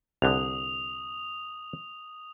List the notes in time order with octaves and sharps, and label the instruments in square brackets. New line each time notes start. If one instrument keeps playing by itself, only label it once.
[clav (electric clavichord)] C2 D3 [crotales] D#6 F7